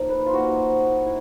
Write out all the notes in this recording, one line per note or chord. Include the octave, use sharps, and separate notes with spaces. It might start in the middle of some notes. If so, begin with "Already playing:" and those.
Already playing: F3 A#3 D#4
B4
F4
F3 A#3 D#4 F#4
E4